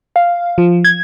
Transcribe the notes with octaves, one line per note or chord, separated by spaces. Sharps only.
F5
F3
G#6